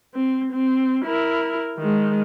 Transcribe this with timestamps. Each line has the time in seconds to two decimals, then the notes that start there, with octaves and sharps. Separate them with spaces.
0.15 C4
0.53 C4
1.05 E4 A#4
1.78 D#3 G#3